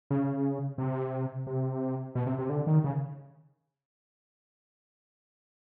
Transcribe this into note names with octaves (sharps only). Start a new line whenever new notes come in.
C#3
C3
C3
B2
C3
C3
D3
D#3
C#3